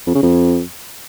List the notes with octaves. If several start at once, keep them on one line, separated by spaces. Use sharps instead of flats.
F2
C#3
F2